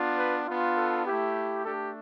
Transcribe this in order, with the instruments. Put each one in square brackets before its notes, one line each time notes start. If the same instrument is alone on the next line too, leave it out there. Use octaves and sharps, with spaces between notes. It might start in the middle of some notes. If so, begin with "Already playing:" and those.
Already playing: [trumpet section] B3 D4 F4
B4
B3 D4 F4
A4
A3 E4 G4
A3 D4 G4 A4